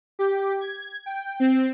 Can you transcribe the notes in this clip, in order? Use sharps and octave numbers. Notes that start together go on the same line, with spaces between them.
G4
G#6
G5
C4